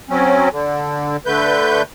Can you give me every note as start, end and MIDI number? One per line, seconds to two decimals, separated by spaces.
0.10 0.49 54
0.10 0.49 60
0.10 0.49 61
0.51 1.17 50
1.26 1.82 50
1.26 1.82 57
1.26 1.82 71
1.26 1.82 91